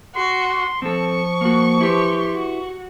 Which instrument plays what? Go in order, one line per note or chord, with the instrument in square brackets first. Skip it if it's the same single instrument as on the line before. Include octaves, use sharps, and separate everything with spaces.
[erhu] F#4 [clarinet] C6
[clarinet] F3 [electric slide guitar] C4 A4 [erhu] C#6
[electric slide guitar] A#3 F#4
[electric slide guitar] E4 B4 [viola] G4 C6
[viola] F#4